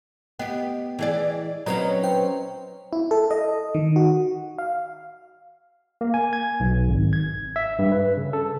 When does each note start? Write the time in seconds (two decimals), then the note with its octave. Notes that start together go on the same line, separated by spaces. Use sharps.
0.39 B3 G4 D#5 G5
0.99 E3 G#4 D5
1.66 F#3 C4 C#4 B4 D#5 A#5
2.03 B4 C5 G5
2.93 E4
3.11 A4
3.31 D#5
3.75 D#3
3.96 F#4
4.58 F5
6.01 A#3
6.14 G#5
6.33 G#6
6.60 B1
6.89 G#1
7.13 G#6
7.56 E5
7.79 G2
7.92 B4
8.17 C#3
8.33 A4